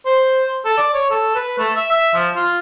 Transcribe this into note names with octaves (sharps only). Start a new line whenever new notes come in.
C5
A4
D5
C#5
A4
B4
A3
E5
E5
F3
F4